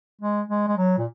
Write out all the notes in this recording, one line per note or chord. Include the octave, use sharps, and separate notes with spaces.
G#3
G#3
G#3
F#3
A#2